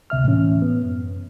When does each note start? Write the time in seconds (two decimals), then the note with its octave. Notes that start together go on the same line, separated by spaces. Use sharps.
0.10 D2 C3 E5 F6
0.24 A2 E3 C#4
0.62 B3
0.84 F#2